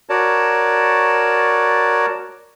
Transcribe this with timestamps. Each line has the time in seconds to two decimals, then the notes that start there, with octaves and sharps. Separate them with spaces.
0.10 F#4 A#4 C#5 D5 A5